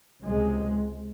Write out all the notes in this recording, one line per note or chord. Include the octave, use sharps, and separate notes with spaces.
C#2 C3 G#3